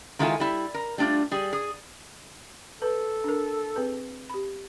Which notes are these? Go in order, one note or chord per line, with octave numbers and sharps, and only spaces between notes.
D#3 G#3 E4 F4 A4 G#5
G3 E4
A#4
G3 A3 D4 F4
G3 G#4
G#4
A4 B4
D4 A#4
C4 G#4 B4
G4 B5